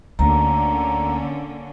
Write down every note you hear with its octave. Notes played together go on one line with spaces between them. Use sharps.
D2 D3 A#3 C#4 A#5